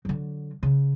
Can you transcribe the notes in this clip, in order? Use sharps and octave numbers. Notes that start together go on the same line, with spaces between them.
D3 F#3
C#3